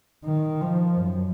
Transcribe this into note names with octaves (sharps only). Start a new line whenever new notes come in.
D#3
F3
F#2